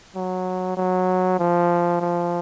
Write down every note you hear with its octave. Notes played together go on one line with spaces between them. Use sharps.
F#3
F#3
F3
F3